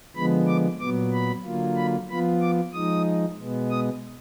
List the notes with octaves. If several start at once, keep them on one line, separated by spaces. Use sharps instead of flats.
D3 F3 G#3 B3 B5
D6
A#2 F#3 B3 D6
B5
D3 F#3 A#3 F4
B5
F3 B3 F4 B5
D6
F3 G#3 D#4 D#6
B2 G#3 B3
D#6